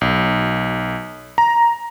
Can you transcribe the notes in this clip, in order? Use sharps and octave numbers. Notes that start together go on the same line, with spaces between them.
B1
A#5